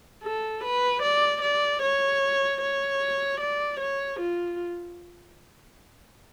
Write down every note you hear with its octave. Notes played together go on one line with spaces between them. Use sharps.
A4
B4
D5
D5
C#5
C#5
D5
C#5
F4